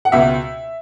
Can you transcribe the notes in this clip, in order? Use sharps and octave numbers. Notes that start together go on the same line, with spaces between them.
F#5
C#2 B2 E5